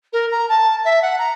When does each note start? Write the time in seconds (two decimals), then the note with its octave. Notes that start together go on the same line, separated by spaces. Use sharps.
0.13 A#4
0.32 A#5
0.49 A5
0.85 E5
1.02 F#5
1.19 A#5